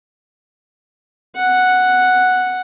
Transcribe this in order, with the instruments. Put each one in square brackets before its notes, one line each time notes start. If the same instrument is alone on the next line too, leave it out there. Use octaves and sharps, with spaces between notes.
[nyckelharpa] F#5